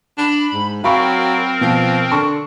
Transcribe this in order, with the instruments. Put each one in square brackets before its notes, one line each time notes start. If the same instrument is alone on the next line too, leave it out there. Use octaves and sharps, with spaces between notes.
[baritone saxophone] D4 [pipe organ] B5
[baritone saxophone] G#2
[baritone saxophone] F#3 [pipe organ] C4 A#4 [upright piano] F5 B5 C#6
[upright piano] B2 [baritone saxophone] F3
[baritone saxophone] D3 [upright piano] A5 C6 C#6